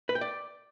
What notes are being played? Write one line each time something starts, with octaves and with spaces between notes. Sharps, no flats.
B4
G5
D5